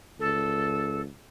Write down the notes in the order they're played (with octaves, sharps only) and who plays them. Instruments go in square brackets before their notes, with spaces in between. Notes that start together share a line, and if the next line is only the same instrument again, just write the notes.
[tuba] C#2 [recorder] A4